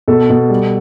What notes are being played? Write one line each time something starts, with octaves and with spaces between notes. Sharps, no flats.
B2 A4
B2
G3